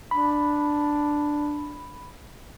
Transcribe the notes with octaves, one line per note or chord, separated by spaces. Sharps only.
D4 B5